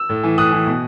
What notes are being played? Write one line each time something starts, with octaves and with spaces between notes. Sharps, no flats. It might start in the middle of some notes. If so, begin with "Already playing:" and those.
Already playing: E6
A2
E3
A2 D#6 F#6
E3
B2